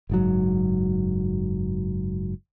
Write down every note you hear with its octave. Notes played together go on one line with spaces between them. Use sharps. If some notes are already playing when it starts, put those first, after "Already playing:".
F#1 G#2 F#3